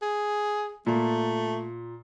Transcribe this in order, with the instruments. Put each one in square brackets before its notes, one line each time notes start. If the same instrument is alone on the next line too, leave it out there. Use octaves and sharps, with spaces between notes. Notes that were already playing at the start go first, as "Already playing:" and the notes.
[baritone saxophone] G#4
[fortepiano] A#2 [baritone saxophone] A3